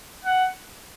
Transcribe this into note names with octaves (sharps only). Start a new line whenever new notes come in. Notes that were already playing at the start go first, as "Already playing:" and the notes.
F#5